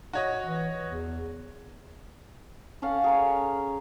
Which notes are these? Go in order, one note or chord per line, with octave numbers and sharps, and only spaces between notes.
F#4 C#5 D#5
E3
E2
C#4 A4 F5 F#5
G#4 A#4 C#5